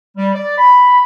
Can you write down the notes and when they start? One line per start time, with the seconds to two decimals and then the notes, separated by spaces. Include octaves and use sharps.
0.17 G3
0.35 D5
0.58 B5